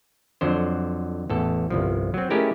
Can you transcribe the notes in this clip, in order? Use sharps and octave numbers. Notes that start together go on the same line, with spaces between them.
F2 D3 F#3 C5
A1 E2 A4
G1 C2 F3
F#3 C4
G#3 A3 C#4 E4 G4 A#4